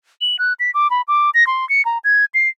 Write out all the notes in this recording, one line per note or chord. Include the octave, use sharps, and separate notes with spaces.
F#7
F#6
B6
D6
B5
D6
A#6
C6
C#7
A#5
G#6
C7